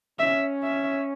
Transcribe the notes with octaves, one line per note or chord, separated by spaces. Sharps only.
C#4 E5
E5